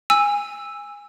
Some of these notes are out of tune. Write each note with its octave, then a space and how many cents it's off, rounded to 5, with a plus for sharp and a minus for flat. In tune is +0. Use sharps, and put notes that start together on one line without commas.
G#5 -15 E6 +0